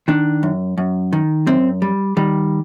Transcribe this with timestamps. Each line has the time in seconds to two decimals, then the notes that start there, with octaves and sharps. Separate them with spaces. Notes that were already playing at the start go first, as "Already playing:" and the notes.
0.08 D#3 D4
0.43 F#2
0.78 F#2
1.13 D#3
1.47 F#2 C4
1.82 G3
2.17 D#3 G3